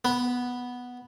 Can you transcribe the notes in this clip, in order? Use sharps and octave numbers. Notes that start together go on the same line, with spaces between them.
B3